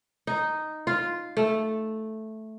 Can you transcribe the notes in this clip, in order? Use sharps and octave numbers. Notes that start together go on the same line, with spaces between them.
D#4
F4
A3